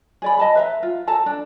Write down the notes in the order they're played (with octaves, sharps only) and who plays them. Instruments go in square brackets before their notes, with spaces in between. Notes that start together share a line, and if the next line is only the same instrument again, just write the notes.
[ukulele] G#4 D5 B5
D#5 A5 B5
B4 E5 A#5
F4
A4 A5 A#5
D4